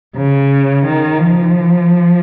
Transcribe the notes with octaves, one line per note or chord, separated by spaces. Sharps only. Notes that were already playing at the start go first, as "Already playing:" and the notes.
C#3
D#3
F3